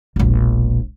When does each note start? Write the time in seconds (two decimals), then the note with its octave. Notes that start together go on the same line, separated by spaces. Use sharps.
0.16 E1 A#1